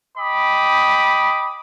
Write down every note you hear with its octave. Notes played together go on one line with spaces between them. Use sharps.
D#5 G5 B5 D6 D#6